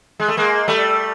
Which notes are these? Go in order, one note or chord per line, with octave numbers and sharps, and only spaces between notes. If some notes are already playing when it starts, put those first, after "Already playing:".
G#3
A3
G#3 A#3
G3 A3